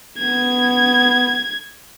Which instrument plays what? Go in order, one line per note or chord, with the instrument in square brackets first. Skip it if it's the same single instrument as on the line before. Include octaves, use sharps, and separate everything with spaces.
[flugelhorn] B3 [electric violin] G#6